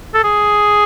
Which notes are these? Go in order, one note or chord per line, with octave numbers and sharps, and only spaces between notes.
A4
G#4